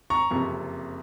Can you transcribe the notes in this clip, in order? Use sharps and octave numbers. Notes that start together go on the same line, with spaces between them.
A#5 C#6
F#1 F2 C3